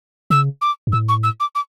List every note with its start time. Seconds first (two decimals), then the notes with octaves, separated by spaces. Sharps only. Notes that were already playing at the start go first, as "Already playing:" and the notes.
0.30 C#3 E6
0.61 D6
0.87 G2
0.92 A2 E6
1.08 C#6
1.23 E6
1.40 D6
1.55 D6